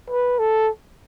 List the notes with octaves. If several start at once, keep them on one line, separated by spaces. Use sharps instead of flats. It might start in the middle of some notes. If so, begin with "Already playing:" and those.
B4
A4